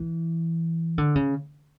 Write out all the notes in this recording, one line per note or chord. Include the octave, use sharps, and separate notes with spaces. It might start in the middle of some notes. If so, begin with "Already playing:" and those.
Already playing: E3
D3
C#3